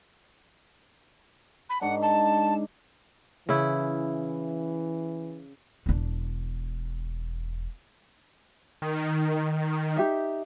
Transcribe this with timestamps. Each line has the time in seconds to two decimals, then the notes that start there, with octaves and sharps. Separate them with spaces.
1.69 B5
1.81 G#2 D4 D#4 F#5
2.02 A5
3.49 C#3 E3 E4
5.86 E1 D4
8.82 D#3
9.97 D#4 G4 E5